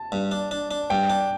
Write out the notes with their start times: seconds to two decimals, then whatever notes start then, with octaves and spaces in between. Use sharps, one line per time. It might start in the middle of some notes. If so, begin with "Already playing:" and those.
Already playing: A5
0.12 G2
0.31 D4
0.51 D4
0.71 D4
0.90 G2 G5
1.10 D4